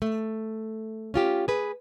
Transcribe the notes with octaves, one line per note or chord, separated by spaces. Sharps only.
A3
C#4 F4 G4
G#4 B4